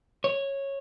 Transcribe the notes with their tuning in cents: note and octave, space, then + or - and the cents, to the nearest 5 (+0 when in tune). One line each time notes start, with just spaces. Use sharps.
C#5 -10